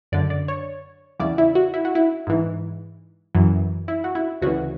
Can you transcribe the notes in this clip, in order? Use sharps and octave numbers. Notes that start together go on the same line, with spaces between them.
F#2 D3 D5
D5
C#5
E2 C#3 E3 D5
E4
F#4
E4
F#4
E4
G#2 E3
F#2 E3
E4
F#4
E4
D2 C#3 E3 F#4